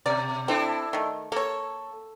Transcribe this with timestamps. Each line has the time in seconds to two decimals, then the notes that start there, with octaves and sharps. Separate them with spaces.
0.06 B2 D5
0.48 C4 D4 E4 A4
0.93 D#3 A3
1.32 A#3 A4 C#5